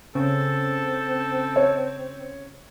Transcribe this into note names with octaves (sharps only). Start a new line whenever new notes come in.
C#3 C4 A4
C#5